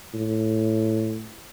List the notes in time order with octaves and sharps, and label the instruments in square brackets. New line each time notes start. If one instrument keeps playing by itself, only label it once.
[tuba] A2